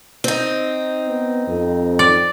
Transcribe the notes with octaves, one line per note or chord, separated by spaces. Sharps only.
C4 D#4
B3
F2
D5